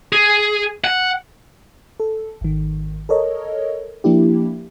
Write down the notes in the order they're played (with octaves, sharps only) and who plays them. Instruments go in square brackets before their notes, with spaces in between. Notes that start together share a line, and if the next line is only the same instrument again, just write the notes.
[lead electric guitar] G#4
F#5
[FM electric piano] A4
G#1 D#3
A4 A#4 C#5 D#5
F3 A#3 D4 E4 G4